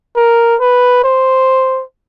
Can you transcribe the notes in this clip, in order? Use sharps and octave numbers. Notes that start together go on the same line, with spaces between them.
A#4
B4
C5